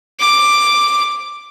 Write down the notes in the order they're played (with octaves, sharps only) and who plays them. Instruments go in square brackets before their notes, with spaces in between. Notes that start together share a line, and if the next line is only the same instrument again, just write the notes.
[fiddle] D6